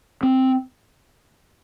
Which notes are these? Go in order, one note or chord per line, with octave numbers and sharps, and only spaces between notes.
C4